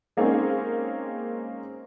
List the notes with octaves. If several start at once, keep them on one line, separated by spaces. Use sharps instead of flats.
G#3 A#3 C4 C#4 D#4 G#4